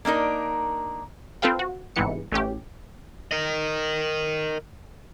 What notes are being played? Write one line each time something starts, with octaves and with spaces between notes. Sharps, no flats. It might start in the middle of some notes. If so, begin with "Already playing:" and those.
A#3 D4 D#4 A#4
C4 F4 A4 B4 F5 G5
F#4
G1 G#2 C3 E3 B3 C#7
A1 A3 C#4 G4
A#4 D#5